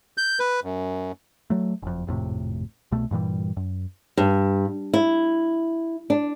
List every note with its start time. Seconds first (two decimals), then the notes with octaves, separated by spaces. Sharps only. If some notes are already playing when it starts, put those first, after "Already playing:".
0.18 G6
0.40 B4
0.64 F#2
1.50 F#3 A3
1.82 F#1 F2
2.07 G#1 F2 A2 C3
2.92 C2 B2 A3
3.11 G2 A#2 E3 G3
3.57 F#2
4.17 G2
4.94 E4
6.10 D4